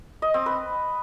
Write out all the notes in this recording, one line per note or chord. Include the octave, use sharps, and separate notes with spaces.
D#5
C4
B4